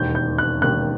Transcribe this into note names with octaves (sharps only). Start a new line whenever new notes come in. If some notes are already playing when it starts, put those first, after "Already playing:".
Already playing: E1 D#2 D#3 G6
G6
F#6
E1 D#2 D#3 F#6